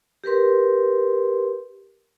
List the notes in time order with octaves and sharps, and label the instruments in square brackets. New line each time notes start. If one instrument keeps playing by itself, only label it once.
[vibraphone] G4 A#4 B4 C6